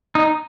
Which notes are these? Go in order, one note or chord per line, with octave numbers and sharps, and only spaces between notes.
D#4